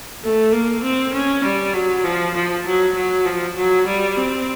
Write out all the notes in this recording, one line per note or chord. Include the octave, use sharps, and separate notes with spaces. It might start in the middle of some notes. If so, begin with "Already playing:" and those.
A3
A#3
C4
C#4
G3
F#3
F3
F3
F#3
F#3
F3
F#3
G3
C4